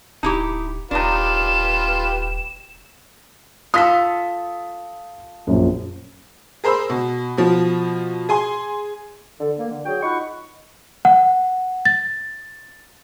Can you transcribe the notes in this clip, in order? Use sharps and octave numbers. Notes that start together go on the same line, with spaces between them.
D1 D#4 E4 G4
D#1 D4 D#4 F4 G4 B4 E7
F4 A4 D#6 B6
A#1 F#2
G#4 A#4 C5 B5 E6
B2
B2 F3
G#4 G#5 C6
D3 A4
A#3
D3
F#3 F#4 G#4 G5
D#4 F4 F#5 B5 C#6
F#5
A6